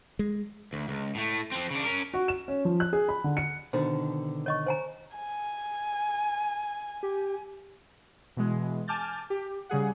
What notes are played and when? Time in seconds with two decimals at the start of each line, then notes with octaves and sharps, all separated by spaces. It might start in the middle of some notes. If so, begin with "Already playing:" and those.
0.19 G#3
0.73 D2
0.88 C#2
1.15 A2 A3
1.52 F3 C4
1.71 C#3 D4
1.84 C#4 A#4
2.14 F#4
2.28 E7
2.48 C#4
2.65 F3
2.80 F#6
2.93 G#4
3.09 B5
3.24 D3
3.37 C#7
3.73 B2 D3 D#3 C5
4.46 C#5 D#5 C#6
4.66 C5 G#5 A#5
5.15 G#5
7.03 G4
8.37 B2 E3 G#3
8.88 G#5 A5 D6 F6 G6 A6
9.30 G4
9.69 C#3 G3 G#4 F#5